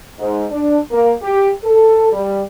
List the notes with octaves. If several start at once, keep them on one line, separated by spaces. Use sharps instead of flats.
G#2
D4
A#3
G4
A4
G3